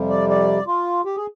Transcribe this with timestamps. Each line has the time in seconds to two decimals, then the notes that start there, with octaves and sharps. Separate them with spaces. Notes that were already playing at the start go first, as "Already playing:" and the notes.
Already playing: F2 C3 G3
0.10 D5
0.29 D5
0.67 F4
1.05 G4
1.16 G#4